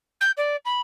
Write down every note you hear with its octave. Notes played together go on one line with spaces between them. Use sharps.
G6
D5
B5